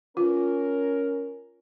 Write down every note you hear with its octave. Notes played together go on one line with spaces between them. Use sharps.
C#4 F4 A#4